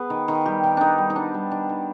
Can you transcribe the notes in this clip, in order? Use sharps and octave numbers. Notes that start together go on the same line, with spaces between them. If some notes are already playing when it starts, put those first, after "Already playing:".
Already playing: B3 G#4 B4
D#3
D#3
G3 G4
D#3
D#3 D4 D#4
G3
D#4
B3 D4
G3
D#3 D4
D#3